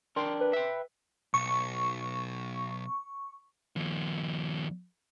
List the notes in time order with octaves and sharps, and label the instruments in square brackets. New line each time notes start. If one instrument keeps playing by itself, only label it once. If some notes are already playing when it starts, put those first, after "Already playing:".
[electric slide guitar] D4 A#4 G5 [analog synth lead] C6
[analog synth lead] B4
[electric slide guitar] E5 G5
[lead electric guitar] B1 [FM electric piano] C#6
[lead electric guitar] D#2 F3